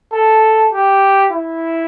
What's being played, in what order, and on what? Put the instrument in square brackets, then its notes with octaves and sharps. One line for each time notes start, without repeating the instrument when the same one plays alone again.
[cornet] A4
G4
E4